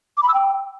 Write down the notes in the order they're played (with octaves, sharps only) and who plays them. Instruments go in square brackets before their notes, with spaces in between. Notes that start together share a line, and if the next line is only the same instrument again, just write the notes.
[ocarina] D6
B5
E6
G5